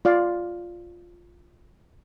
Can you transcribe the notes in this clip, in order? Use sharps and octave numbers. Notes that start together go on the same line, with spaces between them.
F4 D5 F5